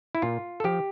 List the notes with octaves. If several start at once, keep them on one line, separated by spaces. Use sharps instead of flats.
E4
A#2 F4
A4
F3 G4